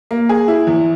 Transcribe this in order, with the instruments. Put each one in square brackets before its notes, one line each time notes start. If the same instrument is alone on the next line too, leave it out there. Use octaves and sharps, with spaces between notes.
[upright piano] A#3
G#4
E4
E2